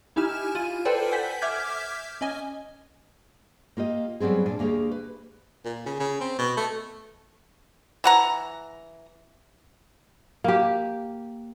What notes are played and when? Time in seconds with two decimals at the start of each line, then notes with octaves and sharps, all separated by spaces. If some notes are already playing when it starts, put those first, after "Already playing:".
0.16 D#4 E4 G4 G#5 F6 E7
0.55 F4 D#7
0.85 A4 B4 C5 D5 G5 G#5
1.12 F#5 G#5 G6 B6
1.42 E5 D6 F6 G6 G#6 B6
2.21 C#4 D#5 G#5
3.77 A#3 F4 G4 D#5
4.20 F#3 G3 B3 C4 G#4
4.46 A#2 D4 G#5
4.59 D2 A#3 G4 G#4 C#5
4.91 B4
5.65 A#2
5.86 C#3
6.00 C#3
6.21 C4
6.39 B2
6.57 A3
8.04 E3 F#5 A#5
10.44 A#3 G4